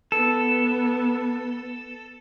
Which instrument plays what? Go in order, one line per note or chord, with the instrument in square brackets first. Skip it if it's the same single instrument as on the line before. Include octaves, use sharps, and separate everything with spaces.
[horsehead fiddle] B3 [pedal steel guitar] A4